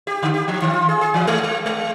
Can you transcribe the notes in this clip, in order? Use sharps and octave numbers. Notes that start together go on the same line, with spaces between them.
G4
D3
G4
F3
D#3
F4
G#4
G#4
E3
G#3
G#3
G#3